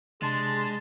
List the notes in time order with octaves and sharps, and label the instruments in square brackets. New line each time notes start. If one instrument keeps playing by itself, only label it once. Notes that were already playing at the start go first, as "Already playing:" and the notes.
[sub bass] C3 [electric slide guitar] G#3 [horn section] D4 G#4 C6 [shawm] A5